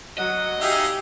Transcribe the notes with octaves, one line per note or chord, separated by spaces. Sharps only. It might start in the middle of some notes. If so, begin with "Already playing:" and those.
F#3 D#5 F#5
D#4 G4 G#4 E5 F5